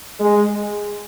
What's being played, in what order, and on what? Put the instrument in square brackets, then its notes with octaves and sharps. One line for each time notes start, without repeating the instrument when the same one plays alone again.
[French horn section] G#3